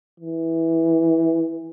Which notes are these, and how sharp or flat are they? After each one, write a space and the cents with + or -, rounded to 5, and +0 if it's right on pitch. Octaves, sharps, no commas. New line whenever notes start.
E3 -10